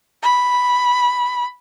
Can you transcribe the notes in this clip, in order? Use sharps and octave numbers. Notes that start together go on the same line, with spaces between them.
B5